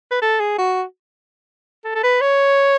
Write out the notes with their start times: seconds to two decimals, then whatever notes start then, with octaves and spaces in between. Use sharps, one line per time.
0.11 B4
0.22 A4
0.40 G#4
0.58 F#4
1.85 A4
1.95 A4
2.04 B4
2.21 C#5